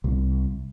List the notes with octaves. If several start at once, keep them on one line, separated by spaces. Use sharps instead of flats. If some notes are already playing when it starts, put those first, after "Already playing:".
C2